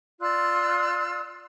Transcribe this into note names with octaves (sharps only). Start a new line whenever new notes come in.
F4 D5 E6 F#6